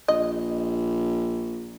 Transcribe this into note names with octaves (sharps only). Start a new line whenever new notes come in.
A#1 D#5